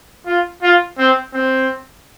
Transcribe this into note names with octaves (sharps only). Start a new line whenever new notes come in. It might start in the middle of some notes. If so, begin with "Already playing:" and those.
F4
F4
C4
C4